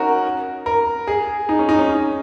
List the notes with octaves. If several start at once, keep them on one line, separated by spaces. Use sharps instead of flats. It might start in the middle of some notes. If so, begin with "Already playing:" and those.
Already playing: C#4 D#4 F#4 A#4
A#4
G#4
D#4
C#4
D#4
C#4